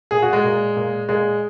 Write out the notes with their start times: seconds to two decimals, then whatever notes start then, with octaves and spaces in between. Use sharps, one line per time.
0.11 A#2 G#4
0.22 F#4
0.33 G#3
0.44 A#2
0.77 A#2
1.09 A#2 G#3